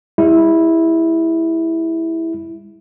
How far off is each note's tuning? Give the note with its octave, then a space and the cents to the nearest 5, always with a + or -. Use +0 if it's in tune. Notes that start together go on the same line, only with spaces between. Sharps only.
G#3 -45 E4 -10